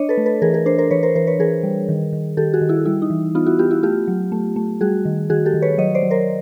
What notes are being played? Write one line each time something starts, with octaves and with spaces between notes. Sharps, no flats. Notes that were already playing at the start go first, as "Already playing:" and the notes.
Already playing: D4 C#5 D#5
A4 B4
A3
A4 B4
E3 G#4 A#4
G#4 A#4
D4 A#4 C5
A#4 C5
E3 B4 C#5
A#4 C5
E3 A#4 C5
B4 C#5
E3 G#4 A#4
G3
D#3
D#3
D#3 G4 A4
F#4 G#4
D#3
E4 F#4
G3 E4
D#4
E3
B3 D#4 F4
E4 F#4
B3 F4 G4
E4 F#4
A3 F4 G4
F#3
A3
A3
G3 F#4 G#4
D#3
D#3 F#4 G#4
G4 A4
D#3
B4 C#5
F#3 C#5 D#5
C5 D5
F#3
A#4 C5